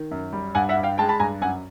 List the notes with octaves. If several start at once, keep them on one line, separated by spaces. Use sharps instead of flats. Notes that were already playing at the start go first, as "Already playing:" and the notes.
Already playing: D#3
F#2
G3
G2 F#5 G#5
E5 F#5
G2
F5 G5
G#3 G5 A5
A5 B5
G2 G#5 A#5
F#2 F#5 G#5